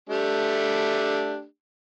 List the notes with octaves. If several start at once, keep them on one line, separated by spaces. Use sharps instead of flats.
A3 D4 G4